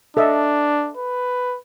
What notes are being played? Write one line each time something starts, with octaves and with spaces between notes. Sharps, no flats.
D4 A4 D#5 E5
B4